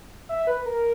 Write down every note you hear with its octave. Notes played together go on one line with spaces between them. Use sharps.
E5
B4
A#4